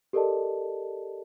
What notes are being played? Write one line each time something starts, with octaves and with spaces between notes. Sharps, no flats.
G4 A4 A#4 D5 D#5 A5